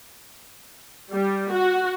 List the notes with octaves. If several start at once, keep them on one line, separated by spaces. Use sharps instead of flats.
G3
F#4